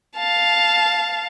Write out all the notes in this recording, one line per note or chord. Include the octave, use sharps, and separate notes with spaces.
F5 A5